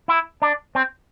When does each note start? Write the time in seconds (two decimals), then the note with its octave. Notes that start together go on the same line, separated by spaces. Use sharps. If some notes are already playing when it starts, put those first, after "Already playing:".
0.08 E4
0.42 D4
0.75 C4